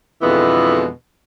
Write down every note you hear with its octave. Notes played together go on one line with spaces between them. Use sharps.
F2 B2 D3 E3 G#3 B3